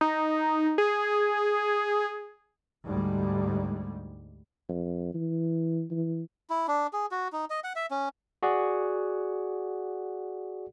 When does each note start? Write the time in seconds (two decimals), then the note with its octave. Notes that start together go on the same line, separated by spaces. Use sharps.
0.01 D#4
0.78 G#4
2.86 D2 G#2 G3
4.69 F2
5.14 E3
5.91 E3
6.50 E4
6.68 D4
6.93 G#4
7.11 F#4
7.33 D#4
7.50 D#5
7.64 F#5
7.76 E5
7.91 C#4
8.43 F#4 G#4 D5 F#5